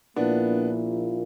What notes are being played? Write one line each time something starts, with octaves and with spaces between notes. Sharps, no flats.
A#1 A#2 A#3 B3 D4 E4